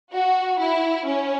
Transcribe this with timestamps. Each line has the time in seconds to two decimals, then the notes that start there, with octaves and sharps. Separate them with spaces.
0.12 F#4
0.59 E4
1.06 C#4